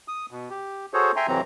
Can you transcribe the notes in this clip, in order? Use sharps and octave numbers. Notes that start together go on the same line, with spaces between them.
D#6
B2
G4
F#4 G#4 A4 C5 C#5
E5 G5 G#5 A#5 C6
F2 C3 E3 F#3 C4 A#5